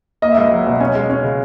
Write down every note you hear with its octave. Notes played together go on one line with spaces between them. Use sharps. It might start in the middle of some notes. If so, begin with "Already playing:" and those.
A#3 D#5
E5
C#2 D#5
F#3
B2
C#4 G#5
G#3
C#4
C#3